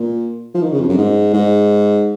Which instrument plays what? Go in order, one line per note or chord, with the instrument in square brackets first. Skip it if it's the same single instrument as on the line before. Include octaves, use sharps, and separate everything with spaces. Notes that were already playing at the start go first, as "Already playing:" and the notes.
Already playing: [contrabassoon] A#2
F3
D#3
C#3
F2
F#2
G#2
G#2